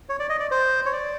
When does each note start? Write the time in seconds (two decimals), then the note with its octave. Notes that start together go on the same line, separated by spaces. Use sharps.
0.09 C#5
0.20 D5
0.29 D#5
0.40 D5
0.51 C5
0.86 C#5
0.93 D5